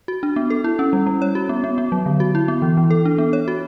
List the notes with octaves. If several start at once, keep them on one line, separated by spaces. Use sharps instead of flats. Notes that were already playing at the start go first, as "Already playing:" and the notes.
F#4
D4
B3
A4
E4
C#4
G3
G3
C#5
F#4
B3
B3
B3
F#3
D3
F#4
E4
B3
E3
E3
A4
D4
B3
C#5
F#4